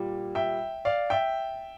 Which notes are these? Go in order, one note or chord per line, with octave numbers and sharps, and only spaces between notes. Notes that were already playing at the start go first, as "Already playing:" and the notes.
Already playing: A#2 G3
E5 G5
D5 F5
E5 G5